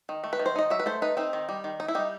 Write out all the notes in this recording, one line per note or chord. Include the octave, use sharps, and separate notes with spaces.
D#3
A3
B4
D#3
C5
D#4 D#5
F#3 E5
B4
A3 C5
D#4 B4
C4 D#4
D#3
G3
D#3
D#4
E4
G3 D#4